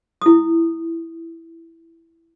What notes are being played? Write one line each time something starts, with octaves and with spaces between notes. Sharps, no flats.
E4 D#6